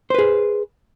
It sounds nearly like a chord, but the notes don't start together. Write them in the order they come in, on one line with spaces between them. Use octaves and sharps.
C5 B4 G#4